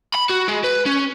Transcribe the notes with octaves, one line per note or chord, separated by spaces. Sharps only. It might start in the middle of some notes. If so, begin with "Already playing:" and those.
B5
F#4
G#3
B4
C#4